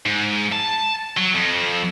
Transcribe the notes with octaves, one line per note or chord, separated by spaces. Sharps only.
G#2
A5
F#3
F2